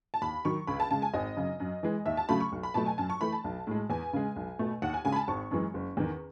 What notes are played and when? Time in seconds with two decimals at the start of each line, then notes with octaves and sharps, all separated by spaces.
0.14 A5
0.22 D#2 B5
0.45 D#3 F#3 C#6
0.67 C#2 B5
0.80 A5
0.91 C#3 G#3 A5
1.02 G#5
1.14 G#1 D#5
1.37 F#2 C#3
1.60 F#2
1.83 E3 G#3
2.06 D#2 E5
2.17 A5
2.29 C#3 F#3 A3 B5
2.40 C#6
2.52 B1
2.63 B5
2.74 B2 F#3 A3 A5
2.86 G#5
2.98 F#2 A5
3.10 C#6
3.21 E3 A3 B5
3.32 A5
3.44 B1
3.67 A2 G#3
3.90 E2 G#5
4.13 C#3 G#3
4.36 B1
4.59 B2 A3
4.82 D#2 F#5
4.94 G#5
5.05 C#3 G#3 G#5
5.12 B5
5.16 A5
5.28 G#1 C#6
5.51 F#2 E3 G#3
5.74 F#1
5.97 E2 D#3